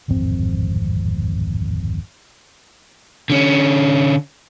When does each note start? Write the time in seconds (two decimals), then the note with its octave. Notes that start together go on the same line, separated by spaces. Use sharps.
0.08 D1 G#1 F2 C4
3.30 D3 C#4